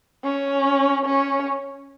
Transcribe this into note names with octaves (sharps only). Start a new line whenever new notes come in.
C#4
C#4